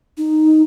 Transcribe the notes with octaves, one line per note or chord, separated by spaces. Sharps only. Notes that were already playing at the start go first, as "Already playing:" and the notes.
D#4